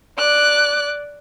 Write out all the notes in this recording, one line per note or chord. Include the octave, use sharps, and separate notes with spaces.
D5 F#6